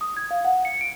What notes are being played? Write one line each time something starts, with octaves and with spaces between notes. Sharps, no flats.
D#6
G#6
F5
F#5
C#7
D7